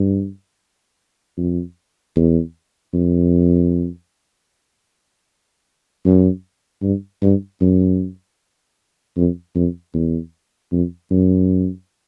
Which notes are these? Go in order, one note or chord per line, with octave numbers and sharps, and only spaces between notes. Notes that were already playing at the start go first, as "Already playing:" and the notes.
Already playing: G2
F2
E2
F2
F#2
G2
G2
F#2
F2
F2
E2
F2
F#2